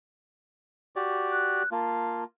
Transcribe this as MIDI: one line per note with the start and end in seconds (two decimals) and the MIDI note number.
0.96 1.63 66
0.96 1.63 67
0.96 1.63 74
1.32 1.69 90
1.71 2.24 58
1.71 2.24 65
1.71 2.23 81